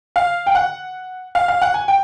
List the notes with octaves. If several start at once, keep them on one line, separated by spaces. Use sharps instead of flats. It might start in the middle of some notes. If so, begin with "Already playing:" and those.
F5
G5
F#5
F5
F5
F#5
G#5
G5